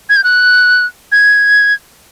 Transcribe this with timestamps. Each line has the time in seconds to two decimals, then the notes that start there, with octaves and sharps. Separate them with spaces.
0.09 G#6
0.16 G6
0.24 F#6
1.12 G#6